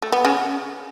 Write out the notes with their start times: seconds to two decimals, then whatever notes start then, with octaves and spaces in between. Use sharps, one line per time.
0.02 A3
0.12 B3
0.25 C#3 C#4